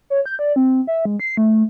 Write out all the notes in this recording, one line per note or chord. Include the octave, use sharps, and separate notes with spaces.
C#5
G6
D5
C4
E5
G#3
C7
A3